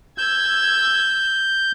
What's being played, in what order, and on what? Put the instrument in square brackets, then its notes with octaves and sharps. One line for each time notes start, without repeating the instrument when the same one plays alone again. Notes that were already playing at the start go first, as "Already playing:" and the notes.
[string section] E6 G#6 [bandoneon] G6